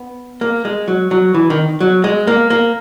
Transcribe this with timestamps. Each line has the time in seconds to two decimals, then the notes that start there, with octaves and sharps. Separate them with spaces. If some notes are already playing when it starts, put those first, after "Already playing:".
Already playing: B3
0.41 A#3
0.65 G#3
0.88 F#3
1.11 F#3
1.34 E3
1.50 D#3
1.80 F#3
2.04 G#3
2.27 A#3
2.50 A#3